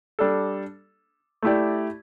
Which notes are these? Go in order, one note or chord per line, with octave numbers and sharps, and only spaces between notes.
G3 D4 A4
A3 E4 G4 D5